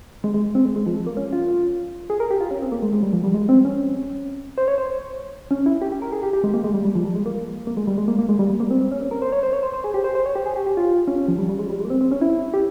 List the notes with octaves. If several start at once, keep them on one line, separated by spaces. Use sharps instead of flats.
G#3
G#3
C4
G#3
G#3
F3
G#3
A#3
C#4
F4
G#4
A#4
G4
F4
C#4
C4
A#3
G#3
G#3
G3
F3
G3
G#3
C4
C#4
C5
C#5
C5
C#4
E4
G4
G4
A#4
G#4
G4
G4
G#3
A#3
G#3
G3
G3
F3
G3
G#3
A#3
A#3
G#3
G3
G#3
A#3
A#3
G#3
G3
G3
A#3
C4
C4
C#4
C#4
A#4
C5
C#5
C5
C#5
C5
C5
G#4
G4
C5
C5
C#5
G4
G#4
G4
G4
F4
C#4
C#4
F3
G3
G3
G#3
G3
G#3
A#3
C4
C4
C#4
E4
G4